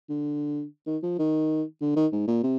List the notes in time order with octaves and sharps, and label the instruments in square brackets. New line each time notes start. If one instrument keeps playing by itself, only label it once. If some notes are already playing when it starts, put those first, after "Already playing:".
[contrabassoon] D3
D#3
F3
D#3
D3
D#3
G#2
A#2
C3